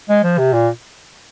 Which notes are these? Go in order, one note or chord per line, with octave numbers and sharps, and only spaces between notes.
G#3
F3
C3
A#2